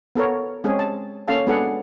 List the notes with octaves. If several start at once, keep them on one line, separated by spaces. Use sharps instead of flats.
B3 A4 A#4 C#5
G#3 C4 C#4 G#4
A5
A#3 C#4 A4 F5 A5
G#3 B3 D4 G#4 A4 F#5